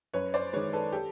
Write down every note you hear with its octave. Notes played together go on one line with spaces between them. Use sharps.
F#2 B4 C#5
C5 D5
D#3 G#3 B4 C#5
A4 B4
G4 A4